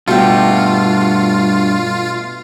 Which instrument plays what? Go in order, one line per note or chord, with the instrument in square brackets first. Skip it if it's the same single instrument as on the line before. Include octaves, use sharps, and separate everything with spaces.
[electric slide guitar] G2 A3 [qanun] B2 G4 [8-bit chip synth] F4